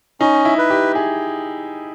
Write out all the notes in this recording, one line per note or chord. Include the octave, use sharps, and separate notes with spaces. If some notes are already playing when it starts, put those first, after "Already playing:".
C#4 D#4
E4
B4
G4
G#4